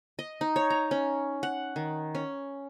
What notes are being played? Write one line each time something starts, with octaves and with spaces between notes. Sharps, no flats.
D#5
D#4
C#5
A#5
C#4
F#5
D#3
C#4